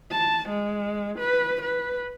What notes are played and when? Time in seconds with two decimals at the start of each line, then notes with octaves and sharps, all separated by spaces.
0.11 A5
0.49 G#3
1.19 B4
1.62 B4